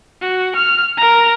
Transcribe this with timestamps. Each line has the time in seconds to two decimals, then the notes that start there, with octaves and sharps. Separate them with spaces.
0.22 F#4
0.56 F6
0.98 A#4 A#5